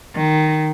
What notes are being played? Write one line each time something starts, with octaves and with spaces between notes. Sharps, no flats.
D#3